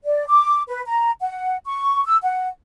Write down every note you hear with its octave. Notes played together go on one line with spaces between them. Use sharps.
D5
D6
B4
A#5
F#5
C#6
E6
F#5